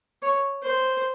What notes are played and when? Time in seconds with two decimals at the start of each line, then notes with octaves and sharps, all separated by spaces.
0.22 C#5
0.63 C5